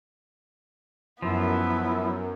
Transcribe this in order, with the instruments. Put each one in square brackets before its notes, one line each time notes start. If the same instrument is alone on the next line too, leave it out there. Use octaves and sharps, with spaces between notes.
[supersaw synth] F#2 [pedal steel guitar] F3 [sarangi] B3 [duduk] E4